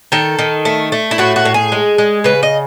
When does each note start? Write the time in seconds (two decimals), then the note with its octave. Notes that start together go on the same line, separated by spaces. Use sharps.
0.12 D#3 A4
0.39 D#3
0.65 A3
0.92 A3
1.11 E4
1.18 A2 F#4
1.36 F#4
1.45 A2
1.54 G#4
1.72 G#3
1.98 G#3
2.24 C#3 B4
2.43 D#5